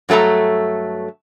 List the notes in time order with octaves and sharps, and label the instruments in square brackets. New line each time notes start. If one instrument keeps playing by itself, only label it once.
[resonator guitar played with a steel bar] G2 F#3 A3 A4 A#5